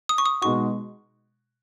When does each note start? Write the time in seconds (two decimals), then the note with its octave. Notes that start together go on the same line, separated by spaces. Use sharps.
0.09 D#6
0.18 C#6
0.26 D#6
0.42 B2 G#3 D#4 F#4 C#6